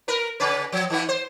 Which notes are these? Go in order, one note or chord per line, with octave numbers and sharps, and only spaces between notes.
A#4 B4
C#3 C#4 B4
F3
D#3 E3 B3
C5